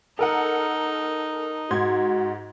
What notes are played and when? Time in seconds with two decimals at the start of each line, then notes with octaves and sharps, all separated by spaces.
0.19 D#4 A4 A#4 F#5
1.71 G#2 F#4 C6 G#6